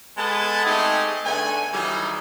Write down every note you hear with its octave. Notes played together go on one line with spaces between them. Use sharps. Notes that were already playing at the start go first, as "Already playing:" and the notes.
G#3 B3 G#4 A4 B4 A5
G#3 A3 C4 D#4 G4 G#4
D3 A3 B3 G#5
D#3 E3 F#3 G3 D#4 G#4